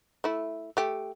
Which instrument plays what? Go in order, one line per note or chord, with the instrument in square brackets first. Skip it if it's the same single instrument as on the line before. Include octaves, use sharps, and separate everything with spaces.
[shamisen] A3 E4
A3 G4